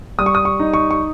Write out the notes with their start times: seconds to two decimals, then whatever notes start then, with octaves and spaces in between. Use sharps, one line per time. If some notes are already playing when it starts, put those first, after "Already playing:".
0.18 G3 D#6
0.26 C#6
0.35 D#6
0.45 C#6
0.59 D#4
0.74 C#6
0.91 C#6